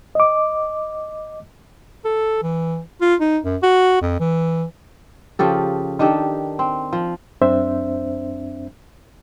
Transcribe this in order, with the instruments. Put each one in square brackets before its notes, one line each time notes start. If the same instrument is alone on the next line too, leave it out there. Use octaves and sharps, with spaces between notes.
[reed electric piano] D#5 D6
[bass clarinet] A4
E3
F4
D#4
F#2
F#4
F2
E3
[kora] C#3 F3 G4 A4
D#3 D4 G4 A4
C4
F3
[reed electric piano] F#2 C4 D4 C5 E5